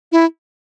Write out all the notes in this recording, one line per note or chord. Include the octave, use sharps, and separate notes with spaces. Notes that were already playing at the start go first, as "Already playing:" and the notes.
E4